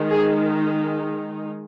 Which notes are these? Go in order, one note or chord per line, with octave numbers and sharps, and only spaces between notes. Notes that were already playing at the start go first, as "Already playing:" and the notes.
Already playing: D#3 G#3 D#4
G#4